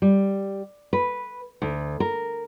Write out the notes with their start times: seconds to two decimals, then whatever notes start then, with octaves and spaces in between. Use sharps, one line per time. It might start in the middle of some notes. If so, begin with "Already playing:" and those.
0.02 G3
0.93 B4
1.62 D2
2.00 A#4